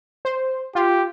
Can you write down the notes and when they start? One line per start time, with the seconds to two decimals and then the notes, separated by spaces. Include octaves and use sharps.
0.25 C5
0.75 F4 G4